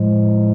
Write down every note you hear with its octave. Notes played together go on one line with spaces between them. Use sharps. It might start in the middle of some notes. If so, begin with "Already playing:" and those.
Already playing: A2 F3 G#3